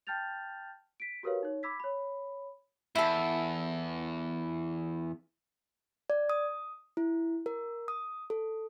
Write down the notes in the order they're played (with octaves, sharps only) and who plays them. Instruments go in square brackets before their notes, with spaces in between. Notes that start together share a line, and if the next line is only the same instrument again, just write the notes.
[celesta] G5 A5 F6 G6 A6 F7
B6 D7
F#4 G4 A#4 B4 C#5 F5
D#4 C#5
B5 D6 E6 G#6 B6
C#5 B5
[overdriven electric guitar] E2 [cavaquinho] E4 A4
[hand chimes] D5
D#6
E4
A#4
D#6
A4